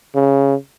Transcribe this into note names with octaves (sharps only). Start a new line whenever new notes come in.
C#3